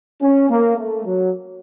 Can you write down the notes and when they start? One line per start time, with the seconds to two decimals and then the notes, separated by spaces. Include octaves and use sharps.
0.21 C#4
0.50 A#3
0.77 A3
1.05 F#3